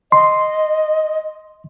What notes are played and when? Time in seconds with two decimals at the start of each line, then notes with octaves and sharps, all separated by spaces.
0.12 D#5 C6